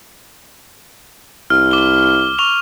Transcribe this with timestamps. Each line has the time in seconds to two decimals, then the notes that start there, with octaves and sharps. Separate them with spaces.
1.50 C2 F6
1.71 D6 G7
2.38 C#6 F7 G7